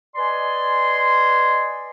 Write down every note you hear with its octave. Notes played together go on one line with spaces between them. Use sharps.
B4 D5 D#5 G#5 C6